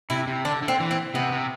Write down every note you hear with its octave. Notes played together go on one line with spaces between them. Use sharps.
C3 E4
C3
D3 D4
D3
C4
E3
C4
C3 B3
C3